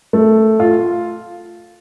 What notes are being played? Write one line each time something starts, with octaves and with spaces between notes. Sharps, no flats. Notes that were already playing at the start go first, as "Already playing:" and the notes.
A3
F4